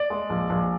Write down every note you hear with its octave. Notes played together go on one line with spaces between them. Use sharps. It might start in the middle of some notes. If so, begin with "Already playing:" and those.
Already playing: D5
G#3
A#1
A#1